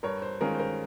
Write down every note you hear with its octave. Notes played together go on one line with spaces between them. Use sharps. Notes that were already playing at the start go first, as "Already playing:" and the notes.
G2 A#4 C#5
C5
D#3 G#3 C#4 F4 A#4
C5
A#4